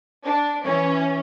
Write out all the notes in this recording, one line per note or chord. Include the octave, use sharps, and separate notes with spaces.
D4
E3 C#4 C#5